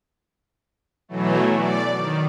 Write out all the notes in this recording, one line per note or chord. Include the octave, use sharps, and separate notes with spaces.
B2 E3 F#3 A3
D5
D#3